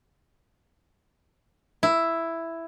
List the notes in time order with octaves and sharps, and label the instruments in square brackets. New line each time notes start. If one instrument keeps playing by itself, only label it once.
[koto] E4